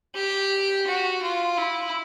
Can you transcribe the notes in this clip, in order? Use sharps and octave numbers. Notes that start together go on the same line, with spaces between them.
G4
F#4
F4
E4